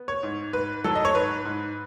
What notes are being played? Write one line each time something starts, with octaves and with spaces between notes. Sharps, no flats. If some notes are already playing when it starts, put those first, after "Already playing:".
Already playing: B3
C#5
G#2
G#2 B4
F#3 A4
D#5
C#5
G#2 B4
G#2